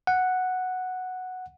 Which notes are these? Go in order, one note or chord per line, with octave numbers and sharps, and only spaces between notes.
F#5